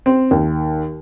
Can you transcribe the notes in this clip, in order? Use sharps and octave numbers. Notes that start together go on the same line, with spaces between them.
C4
D#2